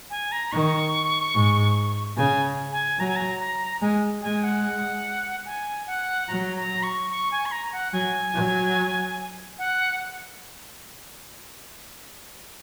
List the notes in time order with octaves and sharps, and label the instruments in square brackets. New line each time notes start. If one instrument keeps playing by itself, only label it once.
[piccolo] G#5
A#5
[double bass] D#3 [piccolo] C#6
[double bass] G#2
[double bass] C#3 [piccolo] G#5
[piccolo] G#5
[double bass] F#3 [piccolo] A#5
[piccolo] G#5
A#5
A#5
[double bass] G#3 [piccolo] G#5
[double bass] G#3 [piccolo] G#5
[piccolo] F#5
G#5
F#5
[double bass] F#3 [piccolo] A#5
[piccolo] A#5
C#6
C#6
G#5
C#6
A#5
F#5
[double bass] F#3 [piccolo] G#5
[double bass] F#3
[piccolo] F#5